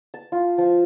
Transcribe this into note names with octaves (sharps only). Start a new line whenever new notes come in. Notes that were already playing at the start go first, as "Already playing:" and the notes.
A5
F4
F3